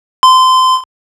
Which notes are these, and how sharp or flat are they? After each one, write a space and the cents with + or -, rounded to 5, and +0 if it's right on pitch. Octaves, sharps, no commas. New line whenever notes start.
C6 -25